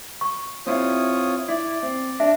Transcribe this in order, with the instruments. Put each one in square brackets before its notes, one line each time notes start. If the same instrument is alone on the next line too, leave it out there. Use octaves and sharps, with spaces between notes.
[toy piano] C#6
[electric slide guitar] C4 E4 [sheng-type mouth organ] F4 C#5 D#6
[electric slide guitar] E4 [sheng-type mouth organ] D5
[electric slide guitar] C4
[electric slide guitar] D4 [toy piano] E5